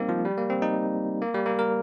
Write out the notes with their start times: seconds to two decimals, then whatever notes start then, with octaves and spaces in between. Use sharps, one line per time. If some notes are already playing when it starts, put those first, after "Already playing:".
Already playing: G3 A#3 C4 D#4
0.09 F3
0.25 G3
0.37 A#3
0.50 C4
0.62 D#4
1.22 A#3
1.34 G3
1.46 A#3
1.59 A#4